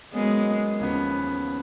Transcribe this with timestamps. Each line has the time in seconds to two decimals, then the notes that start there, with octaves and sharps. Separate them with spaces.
0.13 F#3 G#3 A#3 B3 C#4
0.80 D#2 C#3 F3 B3